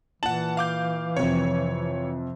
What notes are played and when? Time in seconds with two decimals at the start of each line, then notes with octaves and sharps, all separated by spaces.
0.23 A#2 E3 F#5 A5 F#7
0.57 F5 D6 G6
1.17 F2 C3 C#5